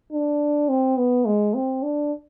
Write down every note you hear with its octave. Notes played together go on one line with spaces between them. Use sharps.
D4
C4
B3
G#3
C4
D4